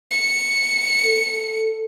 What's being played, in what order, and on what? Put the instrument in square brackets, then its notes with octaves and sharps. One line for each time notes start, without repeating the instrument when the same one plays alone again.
[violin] C#7
[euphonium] A4